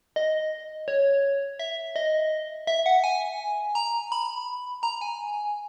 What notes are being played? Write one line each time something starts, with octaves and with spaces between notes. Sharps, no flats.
D#5
C#5
E5
D#5
E5
F#5
G#5
A#5
B5
A#5
G#5